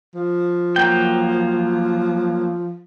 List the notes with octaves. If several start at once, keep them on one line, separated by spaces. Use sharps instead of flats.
F3
F#3 A#3 G5